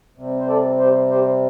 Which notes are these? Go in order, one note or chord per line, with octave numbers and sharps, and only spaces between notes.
C3 G3 C4
C5
A4 D5
G4 C5
G4 C5